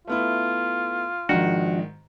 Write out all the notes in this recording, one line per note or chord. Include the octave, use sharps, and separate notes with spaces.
A3 B3 E4 F4
G#2 D#3 F3 D4 F#4